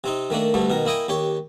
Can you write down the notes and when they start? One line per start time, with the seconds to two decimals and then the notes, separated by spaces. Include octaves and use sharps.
0.04 C3 C4 D#4
0.30 D#3 A3 A#3 D4
0.54 D2 G2 D3 A3
0.70 B2 D#3 A#4
0.85 A#3 E4 D#5 G5 G#5
1.08 D#2 G4 C#5